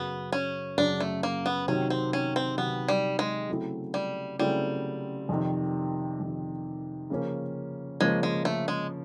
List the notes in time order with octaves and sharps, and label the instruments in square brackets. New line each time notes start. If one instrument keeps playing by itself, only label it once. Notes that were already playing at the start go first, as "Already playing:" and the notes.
Already playing: [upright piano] F#2 C#3 F#3 [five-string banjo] B3
[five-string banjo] C#4
[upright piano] F#2 C#3 F#3 [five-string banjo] D4
[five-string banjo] A3
A#3
B3
[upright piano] C3 D#3 F#3 [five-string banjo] C#4
[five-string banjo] C4
C#4
C4
[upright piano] C3 D#3 F#3 [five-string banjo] B3
[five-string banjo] G3
G#3
[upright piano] C#3 F#3 A3 C4 E4
[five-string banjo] G3
[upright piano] C#3 F#3 A3 C4 E4 [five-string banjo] G3
[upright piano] F2 C3 D#3
F2 C3 D#3
C#3 F3 A#3 C#4
[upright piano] C#3 F3 A#3 C#4 [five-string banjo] G#3
[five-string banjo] G#3
A3
G#3